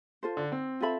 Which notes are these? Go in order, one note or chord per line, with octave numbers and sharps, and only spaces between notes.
F4 A4 C5
D3
C4
F4 A4 E5 B5